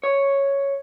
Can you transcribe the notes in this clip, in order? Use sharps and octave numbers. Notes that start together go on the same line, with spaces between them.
C#5